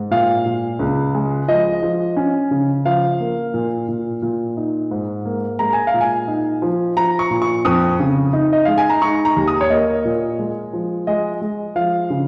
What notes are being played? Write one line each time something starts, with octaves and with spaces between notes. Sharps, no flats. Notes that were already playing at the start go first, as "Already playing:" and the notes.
Already playing: G#2
A#2 F5
A#2
C#2
G#3
F3 D#5
F3
C#4
C#3
F3 F5
A#3
A#2
A#2
A#2
D#4
G#2
A#3
G#3 A#5
G#5
F5
A#2
G#5
D#4
F3
F3 A#5
C#6
A#2
C#6
F2 D#6
C#3
D#4
D#5
G#3 F5
G#5
A#5
D#4 C#6
A#5
D#2
D#6
C#5
A#3 D#5
A#2
G#3
F3
G#3 D#5
G#3
F3 F5
C#3